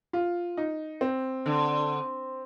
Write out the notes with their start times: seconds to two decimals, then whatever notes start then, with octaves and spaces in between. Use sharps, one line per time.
0.13 F4
0.57 D#4
1.01 C4
1.46 D3